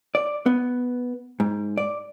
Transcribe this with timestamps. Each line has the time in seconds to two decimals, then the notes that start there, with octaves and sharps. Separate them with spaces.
0.15 D5
0.46 B3
1.40 G#2
1.77 D5